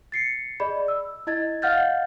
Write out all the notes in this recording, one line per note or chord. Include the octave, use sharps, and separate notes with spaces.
A6 C7 C#7
G#4 D5 D#5 B5
E6
E4 D#5 G#6 A6
D#5 F5 F#5 F6 G6 A6